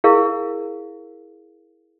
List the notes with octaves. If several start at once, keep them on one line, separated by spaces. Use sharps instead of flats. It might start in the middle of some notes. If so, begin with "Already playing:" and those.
E4 G#4 A#4 F5